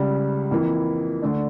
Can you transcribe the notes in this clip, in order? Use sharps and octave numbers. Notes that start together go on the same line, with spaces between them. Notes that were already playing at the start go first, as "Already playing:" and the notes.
Already playing: C#2 C#3 G3
F2 E3 A#3 E4
D3 A3 D4